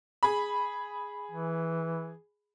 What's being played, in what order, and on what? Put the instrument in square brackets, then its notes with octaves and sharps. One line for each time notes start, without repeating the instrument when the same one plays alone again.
[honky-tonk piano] G#4 B5
[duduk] E3